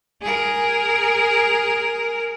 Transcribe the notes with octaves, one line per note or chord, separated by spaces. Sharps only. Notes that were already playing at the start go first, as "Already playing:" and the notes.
G#4 A#4